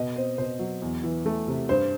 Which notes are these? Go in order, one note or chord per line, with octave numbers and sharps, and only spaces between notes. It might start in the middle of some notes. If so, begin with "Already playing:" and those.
Already playing: B2 D#5
C4 C5
B2 C5
F#3
E2
E3
A3
C3
G2 C5